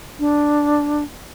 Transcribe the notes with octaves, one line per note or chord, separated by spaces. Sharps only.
D4